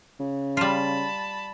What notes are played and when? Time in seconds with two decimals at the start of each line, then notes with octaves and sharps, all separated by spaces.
0.20 C#3
0.57 G3 F4 A5 B5